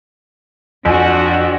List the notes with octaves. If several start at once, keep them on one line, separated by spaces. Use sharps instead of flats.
F2 D4 F#4 G#5